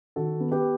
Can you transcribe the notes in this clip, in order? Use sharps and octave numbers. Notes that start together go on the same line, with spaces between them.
D#3 F#4 A4
B3
G4 B4